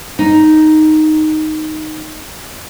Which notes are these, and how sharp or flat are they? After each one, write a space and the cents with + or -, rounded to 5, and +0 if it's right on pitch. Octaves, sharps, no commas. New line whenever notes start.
D#4 +0